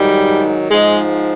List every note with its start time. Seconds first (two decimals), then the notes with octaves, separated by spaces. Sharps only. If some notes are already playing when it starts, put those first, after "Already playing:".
Already playing: G#2 D#3 F#3 G3
0.71 G#2 F3 G#3